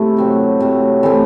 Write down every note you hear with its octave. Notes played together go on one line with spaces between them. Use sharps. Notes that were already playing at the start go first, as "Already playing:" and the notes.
Already playing: C3 A3 E4
F#3 C4 F#4
C3 F#3 A3
E3 A3 C4